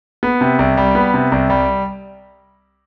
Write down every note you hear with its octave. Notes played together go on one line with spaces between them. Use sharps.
B3
C3
C2
G3
B3
C3
C2
G3